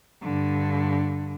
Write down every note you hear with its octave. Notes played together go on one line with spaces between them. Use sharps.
G2 D3